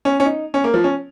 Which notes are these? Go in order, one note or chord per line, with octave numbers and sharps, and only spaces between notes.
C#4
C#4
D#4
C#4
A#3
F3
C#4